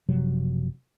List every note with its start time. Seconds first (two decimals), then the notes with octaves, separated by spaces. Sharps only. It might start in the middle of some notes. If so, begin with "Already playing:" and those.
0.09 F#1 C3 F3 F#3